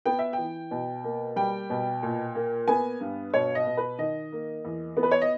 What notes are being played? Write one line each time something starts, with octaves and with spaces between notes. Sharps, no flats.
B3 G5
E5
G5
E3
B2
A#3
G3 G5
B2
A#2
A#3
B3 G#5
G2
B2 C#5
D#5
B2
B4
D#3 D#5
A#3
E2
B3
B4
C#5
D#5